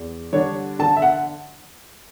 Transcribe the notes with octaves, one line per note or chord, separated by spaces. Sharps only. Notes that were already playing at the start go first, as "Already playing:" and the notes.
Already playing: E2
D3 G3 D4 C#5
D3 A5
E5
F#5